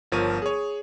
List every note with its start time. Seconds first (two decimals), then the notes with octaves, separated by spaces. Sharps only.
0.12 G1 F3 A#4 C#5 D#7
0.42 G#4 C#5